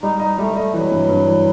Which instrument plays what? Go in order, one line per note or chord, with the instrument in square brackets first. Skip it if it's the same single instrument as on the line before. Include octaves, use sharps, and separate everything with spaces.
[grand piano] G3 [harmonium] D#4
[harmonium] D#4 [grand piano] D#5
[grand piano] G3 [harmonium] A3
[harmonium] A3 [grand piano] D#5
[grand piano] E3 [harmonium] F#3
[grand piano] G2
G2
E3